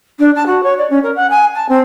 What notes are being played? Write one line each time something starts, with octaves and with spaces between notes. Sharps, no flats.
D4
A5
F#4
C#5
D5
C#4
A#4
F#5
G#5
A5
C4